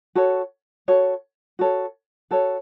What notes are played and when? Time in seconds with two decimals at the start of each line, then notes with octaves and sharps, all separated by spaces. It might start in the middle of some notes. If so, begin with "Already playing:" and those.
0.15 F#4 A4 C#5
0.88 F#4 A4 C#5
1.59 F#4 A4 C#5
2.31 F#4 A4 C#5